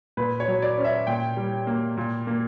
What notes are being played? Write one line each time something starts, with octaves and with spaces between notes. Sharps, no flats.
A#2 B4
C#5
F#3
D5
C#4
E5
A#2 G5
G3
A#3
A#2
A#3